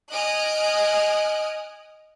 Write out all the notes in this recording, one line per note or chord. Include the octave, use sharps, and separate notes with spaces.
D#5 G#5 D#6 F6 F#6 D7